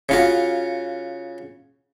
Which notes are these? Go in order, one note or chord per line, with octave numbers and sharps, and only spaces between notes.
C#3 F4 F#4